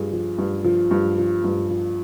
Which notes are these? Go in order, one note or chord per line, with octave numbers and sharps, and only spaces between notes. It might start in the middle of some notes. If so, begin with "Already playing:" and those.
Already playing: G2 F3 G#4
F3
G2
F3
G2
F3
G2
F3